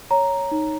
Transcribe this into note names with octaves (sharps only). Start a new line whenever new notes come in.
C#5 A#5
D#4